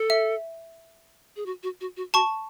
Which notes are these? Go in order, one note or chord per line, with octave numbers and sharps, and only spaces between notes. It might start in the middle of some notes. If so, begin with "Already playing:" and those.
Already playing: A4
E5
G#4
F#4
F#4
F#4
F#4
F#4 A5 C#6